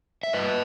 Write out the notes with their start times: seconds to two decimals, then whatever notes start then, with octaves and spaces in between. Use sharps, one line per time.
0.23 E5
0.33 G2 B4 D#5